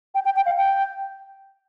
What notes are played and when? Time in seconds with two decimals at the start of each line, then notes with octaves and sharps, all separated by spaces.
0.15 G5
0.25 G5
0.36 G5
0.46 F5
0.57 G5